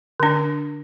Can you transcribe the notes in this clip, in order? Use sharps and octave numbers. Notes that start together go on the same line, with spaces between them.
D3 D4